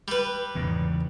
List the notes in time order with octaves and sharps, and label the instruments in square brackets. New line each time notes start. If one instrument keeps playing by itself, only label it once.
[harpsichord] G3 B4
[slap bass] E2 G#2 C#3